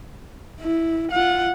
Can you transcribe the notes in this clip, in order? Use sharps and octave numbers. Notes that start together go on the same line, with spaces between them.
E4
F4 F#5